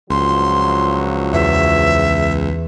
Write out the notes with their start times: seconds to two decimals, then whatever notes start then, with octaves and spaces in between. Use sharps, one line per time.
0.10 C#2 G2 F3 F#3 C6
1.33 E2 E5